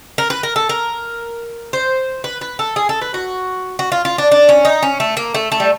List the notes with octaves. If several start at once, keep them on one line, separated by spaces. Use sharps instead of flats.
A#4
B4
A#4
A4
A#4
C5
B4
B4
A4
G#4
A4
B4
F#4
F#4
F4
F4
D4
D4
C#4
D#4
C#4
A3
A#3
A3
A3
G3